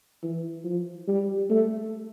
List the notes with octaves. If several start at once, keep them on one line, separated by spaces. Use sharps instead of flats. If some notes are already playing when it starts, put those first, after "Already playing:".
E3
F3
G3
A3